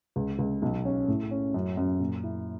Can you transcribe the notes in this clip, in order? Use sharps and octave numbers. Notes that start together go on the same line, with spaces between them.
C#2
C#2
B1
C#4
A2
C#4
F#2
F#2
A#2
E4